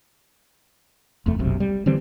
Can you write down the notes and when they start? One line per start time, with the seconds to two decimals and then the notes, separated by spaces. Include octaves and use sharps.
1.26 F1 E2 A3
1.39 F#1 B1 C3
1.60 G3
1.86 D3 E3 G3 C4